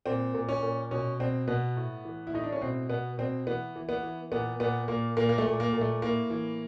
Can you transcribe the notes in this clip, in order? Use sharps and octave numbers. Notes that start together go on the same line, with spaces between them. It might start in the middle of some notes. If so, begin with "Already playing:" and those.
A#2 C4
A#2
C#4
A#2
B2 C#4
B2 C4
B2 B3
A2
E3
E4
A2 D#4
D4
C#4
B2 C4
B2 B3
B2 C4
E3 B3
E3
B3
E3
A#2 B3
A#2 B3
A#2 A#3
A#2 A#3
A#3
A3
A#2
A#3
A#2
A3
A2 A#3
E3